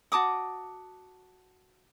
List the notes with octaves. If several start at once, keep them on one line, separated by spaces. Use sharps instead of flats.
F#4 A5 D6 D#6